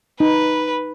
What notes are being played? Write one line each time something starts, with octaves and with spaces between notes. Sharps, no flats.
D#4 B4